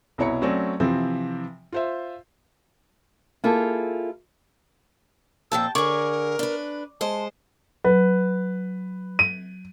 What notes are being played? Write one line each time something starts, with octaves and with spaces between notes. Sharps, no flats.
C2 B2 E4 C#5 A#5 C#7
F#3 A3 C4 C#4 D5
C3 E3 F3 C4
F4 C5 E5
A#3 E4 F4 G#4 A4
F2 A#2 F3 G5 A5 E6
D3 G#4 A#4 C#5 D5 C#6
D4 B4
G#3 C5 D#5 A5
F#3 B4
D#7